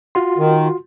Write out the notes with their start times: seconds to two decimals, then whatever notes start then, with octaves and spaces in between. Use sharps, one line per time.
0.15 F4 F#4 C6
0.38 D#3